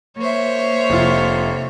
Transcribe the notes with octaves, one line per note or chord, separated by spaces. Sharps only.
A#3 C5 C#5 E5
F1 F4